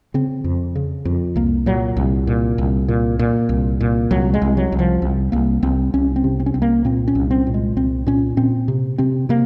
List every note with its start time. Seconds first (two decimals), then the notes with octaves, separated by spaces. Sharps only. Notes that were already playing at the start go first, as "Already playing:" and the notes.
0.14 C#3 C4
0.44 F2
0.75 C#3
1.05 F2
1.36 C2 A#3
1.66 A#2 F#3
1.97 C2
2.27 A#2
2.58 C2
2.88 A#2
3.19 A#2
3.49 C2
3.81 A#2
4.11 C2 F#3
4.34 G#3
4.42 C2
4.57 F#3
4.72 C2
4.79 F3
5.02 C2
5.32 C2 A#3
5.63 C2 C4
5.94 C2 C#4
6.16 C4
6.24 C3
6.40 C4
6.46 C#4
6.54 C2 C4
6.62 A#3
6.85 A#2 C4
7.08 C#4
7.15 C2
7.31 C4
7.47 A#2
7.54 G#3
7.77 C2 C4
8.06 A#2 C#4
8.37 A#2 C4
8.68 C3
8.98 C3 C4
9.29 C3 A#3